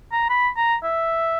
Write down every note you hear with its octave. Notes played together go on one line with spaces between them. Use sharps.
A#5
B5
A#5
E5